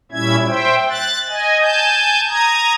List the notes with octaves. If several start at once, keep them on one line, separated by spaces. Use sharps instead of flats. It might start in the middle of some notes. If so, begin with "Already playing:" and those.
A#2 G3 C#4 E4 E5 G#6
C5 E5 G5
F#6 A6
D#5 G#5
G#5 A5 G6
A#5 D#6 G#6